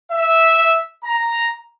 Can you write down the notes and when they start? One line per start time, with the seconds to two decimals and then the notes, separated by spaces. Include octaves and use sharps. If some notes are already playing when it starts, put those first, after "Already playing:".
0.11 E5
1.03 A#5